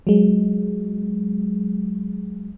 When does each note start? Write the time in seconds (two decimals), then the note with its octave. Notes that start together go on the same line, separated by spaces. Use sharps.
0.07 F#3 G#3